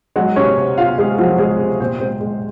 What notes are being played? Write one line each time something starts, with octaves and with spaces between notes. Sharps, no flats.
F#3 G#3 F#4
C3 C#4 C#5
C3
C3 F4 F5
C3 G#3 G#4
F3 F#3 F#4
G#3 G#4
C3
A#2 C4 C5
G#3 C4 C5
G#3